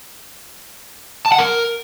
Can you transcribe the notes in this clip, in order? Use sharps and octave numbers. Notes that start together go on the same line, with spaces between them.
A5
F#5
A#4